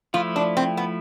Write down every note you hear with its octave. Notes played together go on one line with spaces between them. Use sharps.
F3 A3 E4 F4
D4
C4
B3